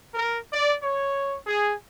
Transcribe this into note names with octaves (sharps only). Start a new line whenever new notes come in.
A#4
D5
C#5
G#4